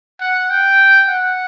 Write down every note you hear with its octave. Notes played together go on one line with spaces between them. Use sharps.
F#5
G5
F#5